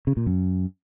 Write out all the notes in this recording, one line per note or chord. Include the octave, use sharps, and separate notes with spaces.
C#3
A#2
F#2